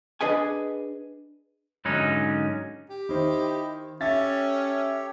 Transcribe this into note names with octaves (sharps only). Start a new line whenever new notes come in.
D4 G#4 B4 D#5 G#5
G#2 D3 F#3 C#4 D#4
G4
D#3 E4 C5 D#5
C#4 G4 A4 C#5 E5 A6